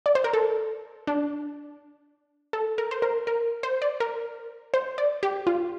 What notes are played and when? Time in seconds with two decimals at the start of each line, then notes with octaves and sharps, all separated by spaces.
0.06 D5
0.15 C5
0.24 A#4
0.33 A4
1.07 D4
2.53 A4
2.78 A#4
2.91 C5
3.02 A#4
3.27 A#4
3.63 C5
3.82 D5
4.00 A#4
4.74 C5
4.98 D5
5.23 G4
5.47 F4